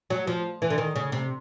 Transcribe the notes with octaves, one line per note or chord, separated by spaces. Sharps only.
F#3
F3
E3
D3
D#3
C#3
C3